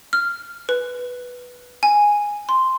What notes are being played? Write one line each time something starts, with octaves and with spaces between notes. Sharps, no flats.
F6
B4
G#5
C6